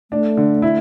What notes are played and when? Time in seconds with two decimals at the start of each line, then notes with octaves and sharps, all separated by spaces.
0.11 A3 D4
0.37 D3
0.62 E4